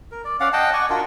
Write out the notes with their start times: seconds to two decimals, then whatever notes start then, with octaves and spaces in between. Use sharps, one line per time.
0.11 A#4
0.24 D5
0.40 C#4 D5 F5 F#5
0.53 D#5 F#5 G5 A5
0.73 D5 F#5 G#5 C#6
0.90 D4 F4 F#4 A#4